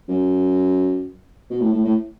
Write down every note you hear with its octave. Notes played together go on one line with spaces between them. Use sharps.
F#2
B2
A2
A2
A2